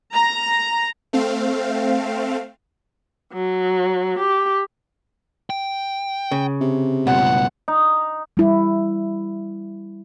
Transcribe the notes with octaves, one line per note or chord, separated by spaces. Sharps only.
A#5
A3 C4 F5
F#3
G4
G5
C#3
C3
C#2 G2 B2 F#5
D#4
G3 E4